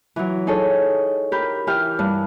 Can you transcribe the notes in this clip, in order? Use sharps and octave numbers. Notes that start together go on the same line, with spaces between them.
E3 F#3
D#4 G#4 A4 C#5
G4 A#4 B5 G6
E3 G4 G5 F6
G2